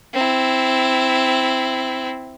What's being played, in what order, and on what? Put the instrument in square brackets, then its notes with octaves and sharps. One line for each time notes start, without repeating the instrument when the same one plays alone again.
[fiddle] C4 E4